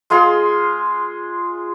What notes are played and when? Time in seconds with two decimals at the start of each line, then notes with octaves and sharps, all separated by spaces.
0.10 G#3 F4 G#4 C6